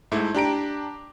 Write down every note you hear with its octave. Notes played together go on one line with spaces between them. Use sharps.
G#2 A3 E4
D4 G4 A#5 D7